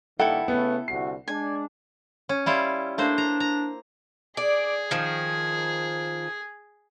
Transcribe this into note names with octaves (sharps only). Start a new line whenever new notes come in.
G2 D#3 A#3 E4 A4 F#5 G5
C#3 A3 B3
C2 D3 F#4 C7
G#3 D4 G#5
C#4
G3 E4 F4
A3 A#3 D4 C5
A#5
A#5
G#4 D5
D#3 F3